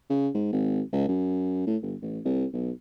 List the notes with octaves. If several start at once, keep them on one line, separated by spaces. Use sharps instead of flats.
C#3
G#2
G#1
C#2
F#2
A2
G1
A1
C2
B1